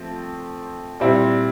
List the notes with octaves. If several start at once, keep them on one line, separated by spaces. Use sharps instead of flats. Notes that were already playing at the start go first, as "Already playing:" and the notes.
Already playing: F3 A3 C4
A#2 G3 C4 E4